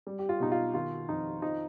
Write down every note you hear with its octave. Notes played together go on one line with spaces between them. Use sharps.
G3
G4
F4
B2 D#4
F4
D#3 F4
F2 D#4
F3 D#4